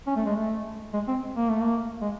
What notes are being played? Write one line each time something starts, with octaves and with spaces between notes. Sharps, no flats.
C#4
A3
G#3
A3
G#3
C4
A#3
A3
A#3
G#3